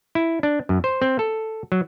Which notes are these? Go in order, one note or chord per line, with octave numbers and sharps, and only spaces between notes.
E4
D4
F#2
C5
C4
A4
F#3